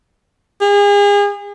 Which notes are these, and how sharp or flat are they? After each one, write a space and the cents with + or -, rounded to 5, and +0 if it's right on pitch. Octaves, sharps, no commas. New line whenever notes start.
G#4 -35